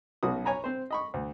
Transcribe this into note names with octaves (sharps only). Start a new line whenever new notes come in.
B1 B2 C#4 F#4 D#6
C#5 G#5 A#5 B5
C4 C5
D#5 B5 C#6
D2